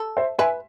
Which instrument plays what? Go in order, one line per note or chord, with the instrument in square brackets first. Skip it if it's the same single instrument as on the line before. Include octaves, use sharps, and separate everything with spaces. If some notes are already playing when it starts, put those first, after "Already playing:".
Already playing: [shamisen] A4
[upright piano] C5 E5
[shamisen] B4 [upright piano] E5 G#5